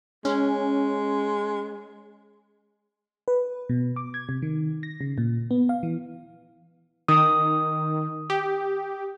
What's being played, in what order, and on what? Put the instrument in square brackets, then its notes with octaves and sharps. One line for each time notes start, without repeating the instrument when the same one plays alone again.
[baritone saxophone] G#3 [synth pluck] C#4
[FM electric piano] B4
B2
D6
G#6
C3
D#3
A#6
C#3
A#2
B3
F5
E3
[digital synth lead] D#3 [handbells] D#6
[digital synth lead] G4